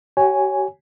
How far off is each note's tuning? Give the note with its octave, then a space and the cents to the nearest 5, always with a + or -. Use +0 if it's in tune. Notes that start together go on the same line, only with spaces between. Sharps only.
G4 -45 C#5 +5 G#5 +0